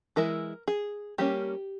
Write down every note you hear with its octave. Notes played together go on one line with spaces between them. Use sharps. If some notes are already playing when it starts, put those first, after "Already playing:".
E3 G#3 E4 A#4
G#4
G3 A#3 C#4 G4